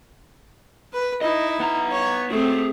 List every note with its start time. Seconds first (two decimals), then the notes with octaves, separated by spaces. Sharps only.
0.93 B4
1.21 D#4 E4 D#5
1.60 B3 A#5
1.92 C#5
2.30 A3 C4 F#4 G#4